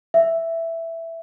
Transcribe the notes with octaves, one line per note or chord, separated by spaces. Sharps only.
E5